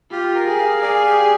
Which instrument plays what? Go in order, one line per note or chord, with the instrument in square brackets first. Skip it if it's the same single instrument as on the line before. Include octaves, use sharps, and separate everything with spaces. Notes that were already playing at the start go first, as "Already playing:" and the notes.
[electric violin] F4 [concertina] G4
[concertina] A#4
[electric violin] G#4
[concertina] F5
[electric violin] G#4 [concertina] D5
[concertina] G4